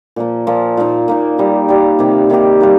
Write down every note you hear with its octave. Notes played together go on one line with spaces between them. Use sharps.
A#2 F3 A#3
A#2 F3 A#3
A#2 A#3 D#4
A#2 A#3 D#4
G3 D#4 G4
G3 D#4 G4
C3 D#3 A#3 G4
C3 D#3 A#3 G4
G3 A#3 D#4